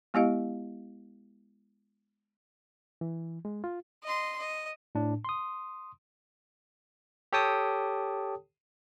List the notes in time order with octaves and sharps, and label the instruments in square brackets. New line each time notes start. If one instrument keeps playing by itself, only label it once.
[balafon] G#3 B3 E4 G4 D#5 F5
[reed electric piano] E3
G#3
F4
[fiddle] D#5 C6
D#5
[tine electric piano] A2 D4
C6 D#6
G4 A4 C#5 G5 A5 D#6